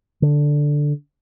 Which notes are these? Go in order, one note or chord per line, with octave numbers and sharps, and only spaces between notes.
D3